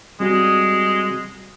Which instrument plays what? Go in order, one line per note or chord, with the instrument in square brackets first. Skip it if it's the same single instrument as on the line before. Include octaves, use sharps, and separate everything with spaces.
[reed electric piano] G3 C4 F#4 [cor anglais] G#3